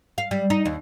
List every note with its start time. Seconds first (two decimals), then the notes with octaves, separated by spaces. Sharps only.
0.18 F5
0.31 G3
0.50 D#4
0.65 D#2